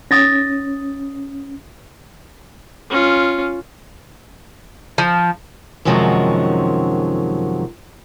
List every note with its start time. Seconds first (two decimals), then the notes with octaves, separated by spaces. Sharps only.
0.11 C#4 D#6 A6 A#6
2.90 C#4 F4
4.98 F3
5.85 F#2 C3 D#3 F3 F#3 G#3